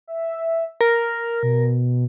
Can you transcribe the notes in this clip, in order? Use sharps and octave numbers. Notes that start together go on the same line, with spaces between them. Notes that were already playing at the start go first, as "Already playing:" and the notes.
E5
A#4 F6
B2